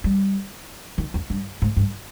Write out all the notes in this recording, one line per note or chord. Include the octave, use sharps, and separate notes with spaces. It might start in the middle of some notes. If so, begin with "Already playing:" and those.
G3
D#3
E2
G2
G#2
G2